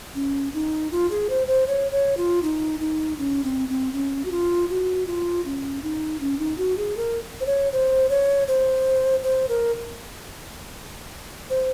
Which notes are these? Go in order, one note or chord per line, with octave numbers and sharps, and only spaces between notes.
C#4
D#4
F4
G#4
C5
C5
C#5
C#5
F4
D#4
D#4
C#4
C4
C4
C#4
F#4
F4
F#4
F4
C#4
D#4
C#4
D#4
F#4
G#4
A#4
C5
C#5
C5
C#5
C5
C5
A#4
C5